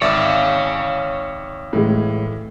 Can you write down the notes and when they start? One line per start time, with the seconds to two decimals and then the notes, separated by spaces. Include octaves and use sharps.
0.01 G#1 C#5 D5 E5 F5
1.73 A2 E3 G#3